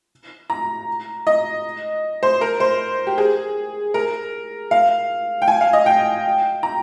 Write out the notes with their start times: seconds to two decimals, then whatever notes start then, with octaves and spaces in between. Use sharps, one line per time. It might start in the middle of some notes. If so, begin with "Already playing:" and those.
0.50 A#5
1.27 D#5
2.23 C5
2.41 A#4
2.60 C5
3.07 G4
3.18 G#4
3.94 A#4
4.71 F5
5.42 G5
5.48 G#5
5.61 F5
5.73 D#5
5.86 G5
6.63 A#5